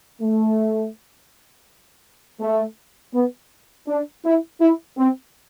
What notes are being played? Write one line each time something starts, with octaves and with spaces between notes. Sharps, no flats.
A3
A3
B3
D4
E4
E4
C4